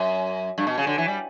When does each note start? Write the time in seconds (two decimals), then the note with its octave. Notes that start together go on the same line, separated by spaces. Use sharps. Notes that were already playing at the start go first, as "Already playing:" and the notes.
Already playing: F#2
0.58 G2
0.67 B2
0.78 C#3
0.87 D3
0.98 E3
1.08 G3